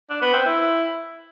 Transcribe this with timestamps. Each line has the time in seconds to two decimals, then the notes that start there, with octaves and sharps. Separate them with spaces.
0.10 D4
0.22 B3
0.33 C4
0.45 E4